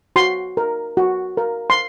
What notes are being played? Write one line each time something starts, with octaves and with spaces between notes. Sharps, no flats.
F#4 C6
A#4
F#4
A#4
C6